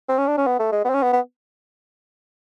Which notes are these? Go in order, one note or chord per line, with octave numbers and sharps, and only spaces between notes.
C4
C#4
D4
C#4
B3
A3
G#3
B3
C4
C#4
B3
B3